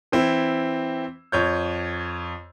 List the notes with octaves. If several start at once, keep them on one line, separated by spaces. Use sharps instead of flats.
E3 C4 E4
F2 C#5 G6